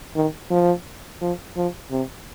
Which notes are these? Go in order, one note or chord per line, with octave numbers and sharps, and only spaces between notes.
D#3
F3
F3
F3
C3